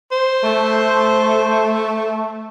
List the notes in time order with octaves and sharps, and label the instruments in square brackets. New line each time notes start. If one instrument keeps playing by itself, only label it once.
[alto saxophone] C5
[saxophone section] A3